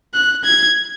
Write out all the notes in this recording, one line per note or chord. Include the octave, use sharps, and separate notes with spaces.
F#6
G#6